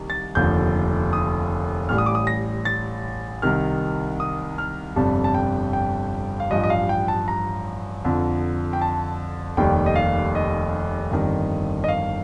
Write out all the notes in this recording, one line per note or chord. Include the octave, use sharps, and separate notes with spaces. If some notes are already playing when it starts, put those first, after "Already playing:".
Already playing: C2 D#3
A6
F1 D#2 D3 F3 G6
D#6
A1 A2 G3 F6
D#6
D6
D#6
A#6
A6
C2 C3 D#3 F6
D#6
F6
G1 F2 C3 G3 A5
A5
G5
G5
F5
A1 G2 F3 D#5
D#5
F5
G5
A5
A#5
F2 D3 F3
G5
A5
F1 D#2 D#3 G3 G5
D#5
F5
D#5
G1 F2 D#3 G3
D#5
F5